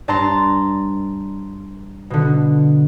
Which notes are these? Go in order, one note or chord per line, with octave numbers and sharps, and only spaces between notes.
G2 D5 A5 A#5 C6 A6
B2 D3